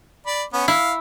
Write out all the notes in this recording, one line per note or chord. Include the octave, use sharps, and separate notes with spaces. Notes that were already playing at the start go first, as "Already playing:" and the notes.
D5 B5
B3 C#4
E4 F5